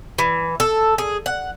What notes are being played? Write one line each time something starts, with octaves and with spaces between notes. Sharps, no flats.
E3
A4
G#4
F#5